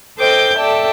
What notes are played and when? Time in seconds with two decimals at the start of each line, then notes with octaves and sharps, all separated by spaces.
0.18 A4 C5 D#5 G5 D6 G6
0.56 A4 D5 E5 G5 A5